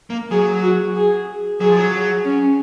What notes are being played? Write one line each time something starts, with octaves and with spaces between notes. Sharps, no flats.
A#3
F#3 G#4
F#4
G#4
F#3 G#4
F3
F#3
C#4